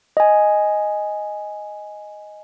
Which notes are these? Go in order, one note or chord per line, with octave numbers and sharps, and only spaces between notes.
D#5 G#5